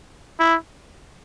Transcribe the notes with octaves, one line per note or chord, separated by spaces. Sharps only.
E4